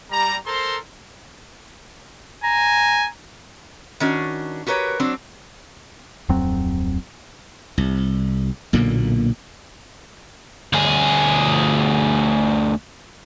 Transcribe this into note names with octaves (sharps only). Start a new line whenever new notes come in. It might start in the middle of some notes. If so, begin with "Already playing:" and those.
G3 A#5
A4 A#4 C5 A#5 C6
G#5 A#5
D#3 C#4 D4 F#4
F#4 G4 A#4 B4 C#5
F#3 C4 D4
D1 F2 F#3 C4
C2
B1 A#2 D3 A#3
D2 G#4